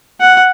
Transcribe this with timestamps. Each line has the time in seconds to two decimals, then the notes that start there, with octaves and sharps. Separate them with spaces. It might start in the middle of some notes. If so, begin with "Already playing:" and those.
0.21 F#5